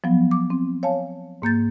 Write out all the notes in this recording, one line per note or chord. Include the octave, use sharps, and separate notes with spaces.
F3 F#3 B3
D6
C4
C#5 F5 G#5 A5
G#2 A#3 G6 A6